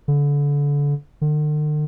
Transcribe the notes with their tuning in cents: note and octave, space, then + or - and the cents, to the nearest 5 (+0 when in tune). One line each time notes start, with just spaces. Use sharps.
D3 -30
D3 +45